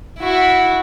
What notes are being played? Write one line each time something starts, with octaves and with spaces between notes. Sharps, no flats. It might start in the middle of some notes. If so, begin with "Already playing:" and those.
E4 F#4